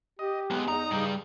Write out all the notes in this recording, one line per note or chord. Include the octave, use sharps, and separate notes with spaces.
G4 D#5
F#3 G#3 B3
E2 D#4 A#5
G2 C#3 G3